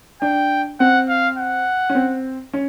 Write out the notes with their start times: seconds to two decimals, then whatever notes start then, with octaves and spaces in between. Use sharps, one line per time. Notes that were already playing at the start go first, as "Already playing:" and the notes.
0.22 D4 G5
0.80 C4 F#5
1.09 F5
1.38 F#5
1.90 C#4
1.95 C4
2.53 C#4